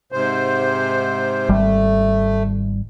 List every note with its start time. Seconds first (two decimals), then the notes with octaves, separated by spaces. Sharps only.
0.12 G#2 C3 C5
1.49 G#1 G3 A3